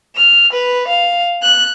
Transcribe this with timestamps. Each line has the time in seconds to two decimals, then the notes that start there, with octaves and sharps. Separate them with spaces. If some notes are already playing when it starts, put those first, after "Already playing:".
0.15 F6
0.51 B4
0.87 F5
1.42 F#6